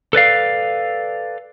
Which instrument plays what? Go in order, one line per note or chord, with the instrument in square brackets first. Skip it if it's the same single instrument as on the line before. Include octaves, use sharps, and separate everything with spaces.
[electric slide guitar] A4 B4 D5 F5